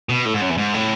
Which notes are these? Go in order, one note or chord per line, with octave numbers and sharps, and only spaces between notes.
B2
A2
G#2
F#2
E2
G#2
A2